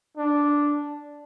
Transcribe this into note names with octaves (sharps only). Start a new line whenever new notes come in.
D4